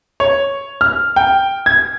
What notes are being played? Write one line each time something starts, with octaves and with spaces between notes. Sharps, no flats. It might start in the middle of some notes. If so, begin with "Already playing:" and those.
C#5
F6
G5
G#6